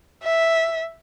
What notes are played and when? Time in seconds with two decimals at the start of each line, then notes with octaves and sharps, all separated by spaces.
0.23 E5